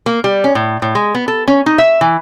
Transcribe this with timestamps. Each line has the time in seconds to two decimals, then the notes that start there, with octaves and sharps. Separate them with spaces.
0.06 A#3
0.24 G3
0.44 C#4
0.55 A2
0.82 A2
0.95 G#3
1.15 B3
1.28 A4
1.48 C#4
1.66 D#4
1.78 E5
2.01 E3